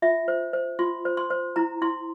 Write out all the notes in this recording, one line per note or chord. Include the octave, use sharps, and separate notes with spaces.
F4 E5
C5
C5
F4 C6
C5
C6
C5
E4 A#5
E4 C6